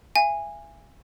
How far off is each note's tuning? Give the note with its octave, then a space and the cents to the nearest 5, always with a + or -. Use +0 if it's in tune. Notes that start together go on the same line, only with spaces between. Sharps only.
E5 +40 G#5 -15